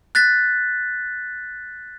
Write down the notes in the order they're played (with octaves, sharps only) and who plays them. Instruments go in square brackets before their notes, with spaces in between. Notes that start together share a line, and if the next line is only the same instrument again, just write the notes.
[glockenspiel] F#6 A6 B6